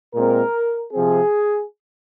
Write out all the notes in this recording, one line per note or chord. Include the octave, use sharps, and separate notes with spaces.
A#2 G#3 C4 A#4
C3 F3 C4 G#4